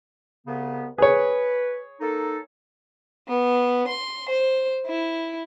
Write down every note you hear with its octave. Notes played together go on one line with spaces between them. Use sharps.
C2 C#3 B3
G#4 B4 C#5
A#3 D#4 A4
B3
C6
C5
E4